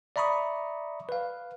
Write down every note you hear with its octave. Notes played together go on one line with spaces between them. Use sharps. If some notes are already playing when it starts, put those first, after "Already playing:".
D5 E5 A#5 B5 C#6 D#6
B4 F5